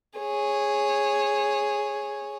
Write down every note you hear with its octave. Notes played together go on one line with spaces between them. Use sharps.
G#4 C#5